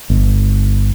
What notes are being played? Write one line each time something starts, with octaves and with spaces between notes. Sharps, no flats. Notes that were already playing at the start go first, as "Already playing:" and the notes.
G1